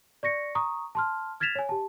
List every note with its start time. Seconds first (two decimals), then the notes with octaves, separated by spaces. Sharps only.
0.23 D5 C#6 A#6 C#7
0.55 A#5 C#6 D#6
0.95 A5 C6 F6
1.40 F6 G#6 A6 B6 E7 F7
1.55 C#5 G#5
1.69 G4 A5